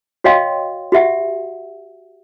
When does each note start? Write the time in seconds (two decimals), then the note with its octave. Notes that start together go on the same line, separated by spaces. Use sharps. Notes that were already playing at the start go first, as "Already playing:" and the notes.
0.24 F#4 C#5 D#5 F5 G5 C6
0.92 F#4 G4 E5 F#5